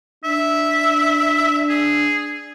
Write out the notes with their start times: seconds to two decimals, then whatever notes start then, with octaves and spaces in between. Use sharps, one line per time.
0.24 D4 E5
1.69 G#4